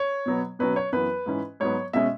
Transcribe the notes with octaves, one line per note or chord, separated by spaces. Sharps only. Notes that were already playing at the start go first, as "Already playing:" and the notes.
Already playing: C#5
B2 F#3 B3
B2 F#3 C#4 B4
C#5
F#2 E3 B3 B4
G#2 E3 C#4
G#2 F#3 B3 C#5
B2 G#3 C#4 E5